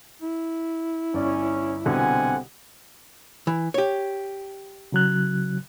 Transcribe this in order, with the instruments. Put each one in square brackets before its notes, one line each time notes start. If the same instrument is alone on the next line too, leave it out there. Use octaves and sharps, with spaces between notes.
[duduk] E4
[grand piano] G1 D5 [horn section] C#4
[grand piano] C2 B2 D3 [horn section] C4 F#5 G#5
[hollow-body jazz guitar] E3
G4 C#5
[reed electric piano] C#3 F#3 F#6